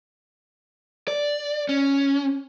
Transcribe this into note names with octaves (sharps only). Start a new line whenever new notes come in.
D5
C#4